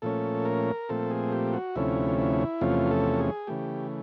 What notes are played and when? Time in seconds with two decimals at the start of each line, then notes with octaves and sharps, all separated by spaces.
0.02 A#2 F3 A3 C#4 A4
0.45 A#4
0.89 A#2 F3 A3 C4 A4
1.11 G#4
1.32 G4
1.53 F#4
1.75 D2 C3 F3 A3 C#4 E4
2.18 E4
2.61 E2 C3 F3 A3 C#4 F4
2.91 A4
3.19 G#4
3.47 C#3 E3 A3 G4